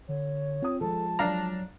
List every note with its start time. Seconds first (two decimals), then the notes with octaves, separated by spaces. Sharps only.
0.09 D3 C#5
0.62 C4 F4 D#6
0.81 F3 G#3 A4 A5
1.19 F#3 D4 F5 A#5